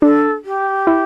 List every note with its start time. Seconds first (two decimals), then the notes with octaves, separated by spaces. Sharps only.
0.02 D4 A4
0.45 G4
0.87 E4